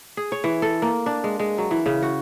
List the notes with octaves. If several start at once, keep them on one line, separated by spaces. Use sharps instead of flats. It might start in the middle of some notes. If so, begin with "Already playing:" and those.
G#4
C#5
E3
A4
A#3
D4
G#3
G#3
F#3
E3
C#3
F#4